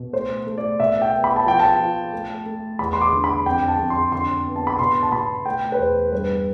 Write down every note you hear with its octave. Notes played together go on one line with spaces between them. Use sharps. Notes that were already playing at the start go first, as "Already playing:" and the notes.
Already playing: B2
A3 C5
A3
D5
B2 E5
G5
B3
B5
A5
F3 G5
A5
F3
A3
A3
E2 B5
C6
D6
D3
B5
F2 G5
A5
F2
C6
D3 C6
B3
A5
B5
B2 C6
A5
B2 B5
A3 G5
B4
E2 C5
G2 B4